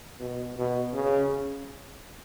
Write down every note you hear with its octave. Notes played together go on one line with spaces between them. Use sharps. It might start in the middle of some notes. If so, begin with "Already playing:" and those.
B2
B2
C#3